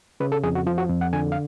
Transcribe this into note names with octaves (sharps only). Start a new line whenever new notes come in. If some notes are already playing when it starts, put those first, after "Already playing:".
C#3 B4
A4
F2 G#4
F#4
F3 F4
F#4
F2
F#5
D3 G#5
F5